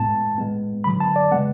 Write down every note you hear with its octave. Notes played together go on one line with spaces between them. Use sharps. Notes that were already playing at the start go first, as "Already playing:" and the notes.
Already playing: A2 G#3 B3 A5
A2 G#3 B3
D3 F#3 B3 B5
A5
D5
C#3 G#3 B3 F#5